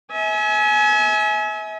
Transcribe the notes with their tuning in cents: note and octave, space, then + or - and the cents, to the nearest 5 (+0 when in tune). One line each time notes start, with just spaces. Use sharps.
E5 -35 G#5 +25